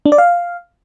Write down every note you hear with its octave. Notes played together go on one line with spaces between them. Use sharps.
D4
D5
F5